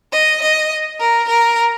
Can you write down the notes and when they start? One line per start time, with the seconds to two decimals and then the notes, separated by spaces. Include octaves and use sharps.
0.12 D#5
0.42 D#5
1.00 A#4
1.28 A#4